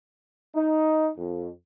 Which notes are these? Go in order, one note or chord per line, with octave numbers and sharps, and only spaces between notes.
D#4
F2